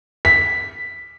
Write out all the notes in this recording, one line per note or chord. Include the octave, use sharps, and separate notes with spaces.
B6